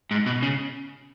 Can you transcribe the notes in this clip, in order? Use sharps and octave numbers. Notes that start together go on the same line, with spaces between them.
G#2
B2
C#3